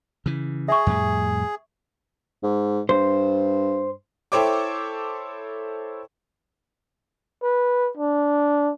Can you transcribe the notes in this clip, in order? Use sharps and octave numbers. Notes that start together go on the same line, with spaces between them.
C#3 E3
G#4 E5 C#6
F2 A2 G3
G#2
G2 C5
E4 A4 C5 C#5 G5 D6
B4
D4